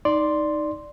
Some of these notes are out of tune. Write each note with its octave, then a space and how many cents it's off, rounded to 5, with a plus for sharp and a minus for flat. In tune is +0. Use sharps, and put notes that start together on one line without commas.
D#4 +0 D5 +0 C6 +0